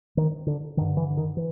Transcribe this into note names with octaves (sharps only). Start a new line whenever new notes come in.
D#3
D3
G2 D3 D#3
E3
D#3
E3